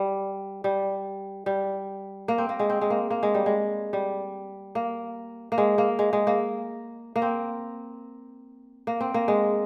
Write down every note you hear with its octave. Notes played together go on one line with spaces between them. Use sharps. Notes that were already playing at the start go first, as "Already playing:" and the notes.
Already playing: G3
G3
G3
A#3
C4
A#3
G#3
C4
G#3
A#3
A#3
G#3
G3
G#3
G3
A#3
A#3
G#3
A#3
G#3
G#3
A#3
A#3
C4
A#3
C4
A#3
G#3